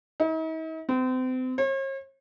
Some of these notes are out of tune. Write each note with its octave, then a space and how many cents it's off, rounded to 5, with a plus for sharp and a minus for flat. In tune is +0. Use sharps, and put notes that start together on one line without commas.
D#4 +45
C4 -35
C#5 -45